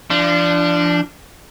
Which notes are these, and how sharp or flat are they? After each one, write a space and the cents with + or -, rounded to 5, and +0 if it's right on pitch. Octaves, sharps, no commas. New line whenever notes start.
F3 -30 D4 +0